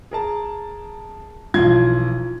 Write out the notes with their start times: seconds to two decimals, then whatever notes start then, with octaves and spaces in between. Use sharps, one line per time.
0.11 G#4 A#4 A5
1.54 B1 E3 F3 F4 G#6